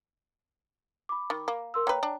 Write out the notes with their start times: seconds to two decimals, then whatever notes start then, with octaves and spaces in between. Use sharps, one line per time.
1.09 B5 D6
1.30 D#3
1.48 A#3
1.74 A#4 C6 E6
1.87 A#3 B4 C#5 G5 A#5
2.03 D4